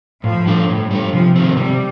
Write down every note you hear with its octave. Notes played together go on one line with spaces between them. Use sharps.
A2 F3
G3 D4 A4
A2
G3 D4 A4
C3 F3
D#3 A3 C4
C3 G3